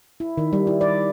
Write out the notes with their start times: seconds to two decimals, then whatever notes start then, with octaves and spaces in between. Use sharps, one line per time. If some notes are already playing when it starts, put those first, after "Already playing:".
0.20 E4
0.37 D#3
0.53 G3
0.67 E4
0.81 D5